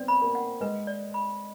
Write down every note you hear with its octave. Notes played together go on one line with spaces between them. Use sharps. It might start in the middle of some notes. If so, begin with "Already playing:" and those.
Already playing: B3 C4 D5
B5
A#3
F#5
G#3 B4
D5
B5